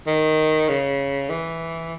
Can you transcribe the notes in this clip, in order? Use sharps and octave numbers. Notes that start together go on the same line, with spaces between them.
D#3
C#3
E3